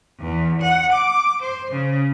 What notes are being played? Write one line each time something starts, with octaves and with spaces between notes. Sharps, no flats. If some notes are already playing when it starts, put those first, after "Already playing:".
E2
F#5
D6
C5
C#3